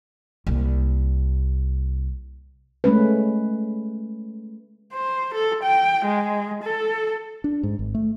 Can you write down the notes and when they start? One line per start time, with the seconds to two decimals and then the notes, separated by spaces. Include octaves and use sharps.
0.47 C2 A#3
2.84 G#3 A3 C#4 B4
4.93 C5
5.34 A4
5.63 G5
6.05 G#3
6.63 A4
7.44 D4
7.63 G#2
7.79 G#1
7.95 A3